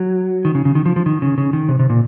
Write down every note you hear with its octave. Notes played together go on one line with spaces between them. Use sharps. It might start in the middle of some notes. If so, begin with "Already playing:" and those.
Already playing: F#3
D#3
C#3
C#3
D#3
F3
F3
D#3
C#3
C#3
D#3
C3
C3
A#2